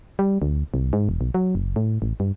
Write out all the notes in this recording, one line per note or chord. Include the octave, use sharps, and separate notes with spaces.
G3
D2
C2
G#2
E1
B1
F#3
F#1
A2
A1
G2